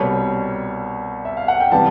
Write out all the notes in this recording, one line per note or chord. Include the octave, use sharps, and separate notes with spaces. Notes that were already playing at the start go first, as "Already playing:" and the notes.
Already playing: C2 B2 G3 C#5
E5
F5
F#5
G5
C3 E3 G3 B3 A5